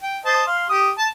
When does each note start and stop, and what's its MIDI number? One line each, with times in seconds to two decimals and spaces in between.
0.03 0.18 79
0.26 0.42 72
0.26 0.42 75
0.26 0.42 81
0.47 0.66 77
0.47 0.66 84
0.70 0.91 67
0.70 0.91 87
0.98 1.07 81